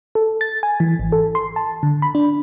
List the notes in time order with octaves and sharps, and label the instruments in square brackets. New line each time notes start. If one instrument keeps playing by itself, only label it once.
[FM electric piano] A4
A6
G#5
E3
G#1
A4
C6
A5
D3
B5
D4